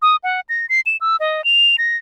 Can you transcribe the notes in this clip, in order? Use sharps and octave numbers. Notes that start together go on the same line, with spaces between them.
D#6
F#5
A#6
C7
E7
E6
D#5
F7
A#6